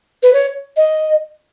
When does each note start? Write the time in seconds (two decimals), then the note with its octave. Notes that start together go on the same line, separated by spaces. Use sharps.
0.23 B4
0.33 C#5
0.77 D#5